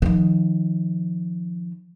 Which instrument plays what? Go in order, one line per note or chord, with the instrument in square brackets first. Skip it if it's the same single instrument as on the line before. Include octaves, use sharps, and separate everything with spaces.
[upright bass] D#3 F3